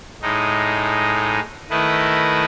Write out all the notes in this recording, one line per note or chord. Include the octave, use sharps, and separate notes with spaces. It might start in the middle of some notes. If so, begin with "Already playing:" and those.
A2 G#3 D#4
D#3 A3 E4 B4 D#5